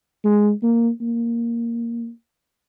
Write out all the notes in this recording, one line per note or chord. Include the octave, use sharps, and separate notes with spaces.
G#3
A#3
A#3